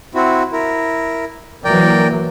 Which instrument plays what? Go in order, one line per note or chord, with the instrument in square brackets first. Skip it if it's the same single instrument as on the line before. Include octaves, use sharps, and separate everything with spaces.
[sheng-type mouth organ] C4 E4 F#4
E4 A#4
[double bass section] E3 F#3 A#3 [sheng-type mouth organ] A#4 D5 G5